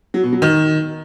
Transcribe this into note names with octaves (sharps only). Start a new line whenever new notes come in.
F#3
B2
F#3
D#3